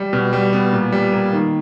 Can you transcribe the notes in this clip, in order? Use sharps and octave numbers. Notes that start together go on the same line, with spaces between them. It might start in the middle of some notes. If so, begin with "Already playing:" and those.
Already playing: G3
B2
G3
B3
A#2
G3
A#3
D#3